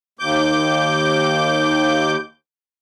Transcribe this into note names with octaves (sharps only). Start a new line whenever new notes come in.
D#2 D6 G6